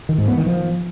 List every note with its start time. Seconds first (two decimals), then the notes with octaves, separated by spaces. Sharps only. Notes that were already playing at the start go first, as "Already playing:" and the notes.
0.09 D#3
0.18 G#2
0.28 B3
0.37 D#3
0.47 F3